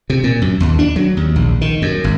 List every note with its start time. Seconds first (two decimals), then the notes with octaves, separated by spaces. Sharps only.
0.10 C3
0.24 A#2
0.42 F#2
0.60 D#2
0.79 D4
0.96 F#3
1.17 D#2
1.36 A#1
1.61 D#3
1.82 F#2
2.04 G#1